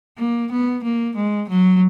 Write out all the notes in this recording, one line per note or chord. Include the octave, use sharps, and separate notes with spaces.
A#3
B3
A#3
G#3
F#3